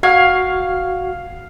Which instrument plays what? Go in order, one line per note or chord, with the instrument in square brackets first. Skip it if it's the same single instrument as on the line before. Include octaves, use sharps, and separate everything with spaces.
[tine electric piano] F#4 G#6 [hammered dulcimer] F5